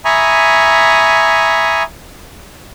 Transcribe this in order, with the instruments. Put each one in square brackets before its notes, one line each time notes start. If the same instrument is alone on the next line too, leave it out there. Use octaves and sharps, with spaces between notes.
[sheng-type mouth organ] E5 G#5 A#5 B5 C#6 D#6